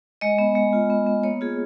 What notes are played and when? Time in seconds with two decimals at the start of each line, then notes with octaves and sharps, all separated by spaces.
0.21 G#3 D#5
0.39 B3
0.55 G#3
0.73 F4
0.90 B3
1.06 B3
1.23 A#3 C#5
1.41 F4 G#4